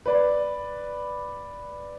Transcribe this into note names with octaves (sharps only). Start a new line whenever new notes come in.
B4 D5